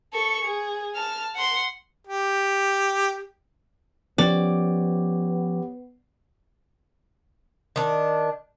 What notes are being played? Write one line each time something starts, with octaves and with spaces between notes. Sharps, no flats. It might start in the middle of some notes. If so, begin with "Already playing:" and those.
A4 C#6
G#4
A5 F6
F#5 C6
G4
F3 B3 C#4 G4 C#5 D5
D#3 D4